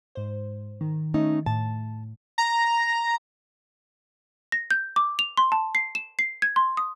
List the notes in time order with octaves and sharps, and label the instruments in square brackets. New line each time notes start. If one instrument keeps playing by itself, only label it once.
[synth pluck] G#2 C5
D#3
[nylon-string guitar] A3 C#4 D#4
[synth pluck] A2 [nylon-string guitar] A5
[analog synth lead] A#5
[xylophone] A#6
G6
D6
F7
C6
A5
C7
E7
C7
G#6
C6
D#6